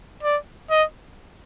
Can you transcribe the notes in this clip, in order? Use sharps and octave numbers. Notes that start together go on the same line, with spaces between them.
D5
D#5